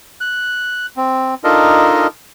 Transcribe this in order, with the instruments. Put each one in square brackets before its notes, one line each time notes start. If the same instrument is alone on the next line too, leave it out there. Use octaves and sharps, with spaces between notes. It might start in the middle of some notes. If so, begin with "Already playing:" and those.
[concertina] F#6
C4
D4 D#4 F4 A4 A#4 D#5